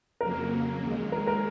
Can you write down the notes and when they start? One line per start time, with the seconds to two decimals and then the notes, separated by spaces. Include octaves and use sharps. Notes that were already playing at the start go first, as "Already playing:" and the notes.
0.21 F2 C#3 F#3 A#3 A#4
0.82 D#2 D#3 G#3
1.12 A#4
1.27 A#4